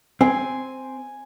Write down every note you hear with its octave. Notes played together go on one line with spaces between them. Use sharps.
C4 G#5